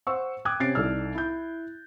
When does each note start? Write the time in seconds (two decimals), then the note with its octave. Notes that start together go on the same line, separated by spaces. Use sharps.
0.07 C5 F#5 C#6 E6
0.45 G5 D6 D#6 F#6 G#6
0.60 C3 C#4 A6 C7 D7
0.75 C2 D#4 A4 D5 E6 F6
1.14 E4 G6